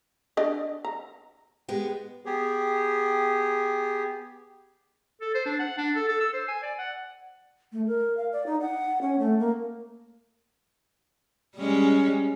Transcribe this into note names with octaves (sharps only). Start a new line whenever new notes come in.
D4 D5 D#5
A#5
G#3 B3 G4
B3 G4 G#4
A4
C5
D4
F#5
D4
A4
A4
E6
C5
G#5
D5
F#5
A3
A#4
F5
D5
D#4
F#5
C#4
A3
A#3
G3 G#3 C#4